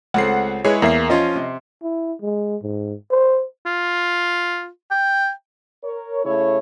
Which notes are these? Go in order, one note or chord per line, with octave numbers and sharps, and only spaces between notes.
C#2 A3 C4 F#5 C7
G#3 E4 G#4 B4 C#5 B5
E2 A#3 E5 C7
F3 C#4 F4 D#5
C3
E4
G#3
G#2
C5
F4
G5
A#4 C#5
C#3 A3 E4 C#5